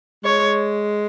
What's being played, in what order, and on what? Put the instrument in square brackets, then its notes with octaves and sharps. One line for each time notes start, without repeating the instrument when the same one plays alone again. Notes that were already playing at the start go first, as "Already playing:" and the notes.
[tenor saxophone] G#3 [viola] C#5